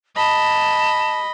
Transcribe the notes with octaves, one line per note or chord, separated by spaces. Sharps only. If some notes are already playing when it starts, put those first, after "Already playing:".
D#5 A5 B5